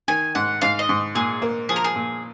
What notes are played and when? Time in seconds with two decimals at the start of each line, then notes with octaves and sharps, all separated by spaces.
0.08 D#3 G#5
0.35 G#2 F#5
0.62 G#2 F5
0.79 D#5
0.89 G#2
1.15 A#2 G#4
1.42 A#3
1.69 F3 G#4
1.76 A#4
1.84 G#4
1.96 A#2